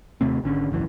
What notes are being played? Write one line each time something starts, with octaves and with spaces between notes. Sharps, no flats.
D#2 C3 A3 C4
G#1 D3 C#4
G#1 C#2 F#2 E3